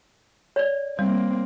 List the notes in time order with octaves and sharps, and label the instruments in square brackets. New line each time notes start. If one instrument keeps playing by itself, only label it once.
[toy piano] C#5 D5
[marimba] G3 [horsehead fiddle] A#3 C4